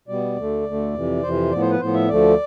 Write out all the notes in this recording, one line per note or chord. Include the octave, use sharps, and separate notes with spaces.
B2 G3 B3 D5
D2 D3 A3
D2 D3 A3
F2 C3 E3
F2 C3 E3 C5
A2 F3 B3 D5
C5
B4
A2 F3 B3 C5
E5
D2 D3 F3 A3 D5